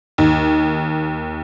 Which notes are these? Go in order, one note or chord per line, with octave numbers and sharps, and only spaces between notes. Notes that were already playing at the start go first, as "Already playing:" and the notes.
D#2